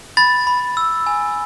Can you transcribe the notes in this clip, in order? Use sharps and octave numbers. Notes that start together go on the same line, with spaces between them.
B5 A6
B5
E6
G#5